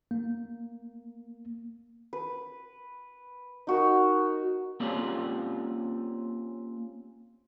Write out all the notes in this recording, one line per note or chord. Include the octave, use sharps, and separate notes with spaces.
A#3
B4
D#4 F#4 A#4
A#3 C4 C#4 F4 G4 D5